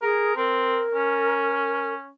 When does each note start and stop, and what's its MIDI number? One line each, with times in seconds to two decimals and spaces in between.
0.02 0.36 68
0.02 0.32 70
0.36 0.81 60
0.36 1.92 70
0.94 2.09 61